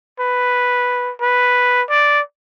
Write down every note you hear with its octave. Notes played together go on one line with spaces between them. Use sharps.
B4
B4
D5